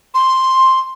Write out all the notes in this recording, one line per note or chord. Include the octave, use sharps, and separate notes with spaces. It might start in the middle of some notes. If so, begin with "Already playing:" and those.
C6